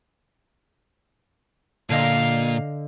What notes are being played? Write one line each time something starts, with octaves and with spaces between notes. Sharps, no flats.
A#2 D3 D#5 F5